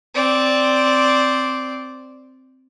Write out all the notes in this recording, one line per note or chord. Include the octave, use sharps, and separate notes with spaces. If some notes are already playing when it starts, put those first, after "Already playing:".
C4 D5